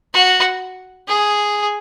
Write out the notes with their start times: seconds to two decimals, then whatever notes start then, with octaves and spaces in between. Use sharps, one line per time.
0.14 F#4
1.08 G#4